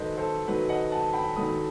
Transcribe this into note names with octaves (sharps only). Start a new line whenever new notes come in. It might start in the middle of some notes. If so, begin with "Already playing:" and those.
Already playing: D#3 F#3 A3 B4 C5 D#5
A4 C5
D#3 F#3 A3 B4
D#5 F#5
F#5 A5
G5 B5
D#3 F#3 A3 B5 D#6